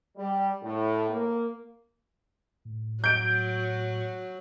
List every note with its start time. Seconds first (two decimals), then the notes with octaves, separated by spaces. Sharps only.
0.17 G3
0.63 A2
1.10 A#3
2.65 A2
3.04 F#3 G6 D7